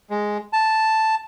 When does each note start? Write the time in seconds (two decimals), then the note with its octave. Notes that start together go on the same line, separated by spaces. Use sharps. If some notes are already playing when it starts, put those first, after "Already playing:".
0.10 G#3
0.53 A5